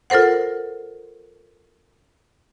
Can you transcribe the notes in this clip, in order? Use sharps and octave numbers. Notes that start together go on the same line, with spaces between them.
F4 A4 A#4 C5 F#5